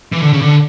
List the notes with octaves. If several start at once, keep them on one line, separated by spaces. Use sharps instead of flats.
E3
D3
C#3
D3